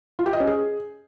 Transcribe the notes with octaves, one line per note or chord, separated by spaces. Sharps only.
F4
G4
D#5
C#4
G#4